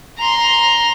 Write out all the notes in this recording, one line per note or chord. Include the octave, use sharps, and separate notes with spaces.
A#5 C6